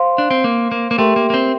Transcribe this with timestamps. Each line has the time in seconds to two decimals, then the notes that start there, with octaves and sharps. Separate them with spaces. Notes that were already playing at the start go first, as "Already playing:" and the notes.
Already playing: C5 F5 C6
0.18 D4
0.31 C4
0.44 A#3
0.71 A#3
0.91 A#3
0.98 A3 G4 A#4 E5 G5 C6
1.16 A#3
1.30 A#3
1.34 C4